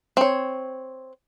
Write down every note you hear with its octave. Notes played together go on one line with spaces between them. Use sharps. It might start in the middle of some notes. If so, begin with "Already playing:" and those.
C4 C#5